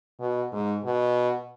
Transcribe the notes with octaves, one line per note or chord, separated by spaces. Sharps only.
B2
G#2
B2